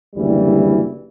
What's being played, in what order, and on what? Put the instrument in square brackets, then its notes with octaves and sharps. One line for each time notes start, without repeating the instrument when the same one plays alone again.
[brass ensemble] F#1 D2 E3 G3